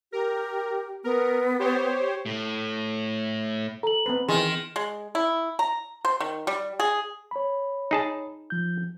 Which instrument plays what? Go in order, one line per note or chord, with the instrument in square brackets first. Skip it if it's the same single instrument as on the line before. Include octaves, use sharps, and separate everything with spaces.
[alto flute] G4 [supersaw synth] A#4
[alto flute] B3 [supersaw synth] A#4
[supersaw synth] G4 C5 C#5
[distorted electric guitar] A2
[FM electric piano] A4 [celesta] A#5 F#7
[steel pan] B3 C4 B4
[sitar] D#3 [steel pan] E3 [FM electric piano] G#4 [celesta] C6
[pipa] G#3
E4
A#5
C5
D#3
G3
G#4
[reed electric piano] C#5 B5
[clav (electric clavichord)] D#4 G#4 A5
[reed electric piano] F3 G6